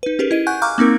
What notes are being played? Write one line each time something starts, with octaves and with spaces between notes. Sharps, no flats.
D#4 B4
C#4 G4 G#4 A#4 B4
E4 D#5 D#7
F#5 G#5 C#6 F#6 G6
F5 A#5 C#6 D6 F6 F#6
A#3 C4 D#4 A#4